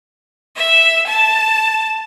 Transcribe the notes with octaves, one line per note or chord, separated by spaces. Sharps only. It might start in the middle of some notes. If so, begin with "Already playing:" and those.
E5
A5